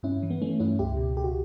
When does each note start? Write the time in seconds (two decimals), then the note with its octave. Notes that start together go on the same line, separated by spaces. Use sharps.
0.03 G2 C#4 E4
0.23 E3
0.30 B3
0.41 E3 A3 C#4
0.60 G2 C#4 E4
0.79 C#2 E4 G4
0.97 B2
1.16 C#2 G4
1.24 F#4